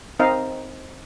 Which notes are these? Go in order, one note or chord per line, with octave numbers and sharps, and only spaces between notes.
C4 D#4 A#4 D#5 F5